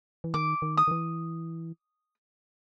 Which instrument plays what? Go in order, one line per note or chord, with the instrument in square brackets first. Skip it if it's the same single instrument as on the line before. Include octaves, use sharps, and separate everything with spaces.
[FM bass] E3
[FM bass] D#3 [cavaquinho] D6
[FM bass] D#3
[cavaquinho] D#6
[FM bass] D#3
E3